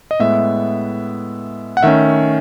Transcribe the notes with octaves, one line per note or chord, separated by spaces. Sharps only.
D#5
A2 G#3 B3 E5
F#5
D#3 A3 C#4 E5